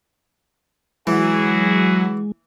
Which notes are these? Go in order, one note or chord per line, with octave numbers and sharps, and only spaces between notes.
E3 F#3 G#3 E4 F#4 G#4